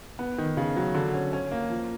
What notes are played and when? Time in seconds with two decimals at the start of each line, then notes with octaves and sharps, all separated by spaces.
0.19 B3
0.38 D#3
0.57 C#3
0.76 F#3
0.94 D3
1.14 C#4
1.33 C#4
1.51 A#3
1.70 F3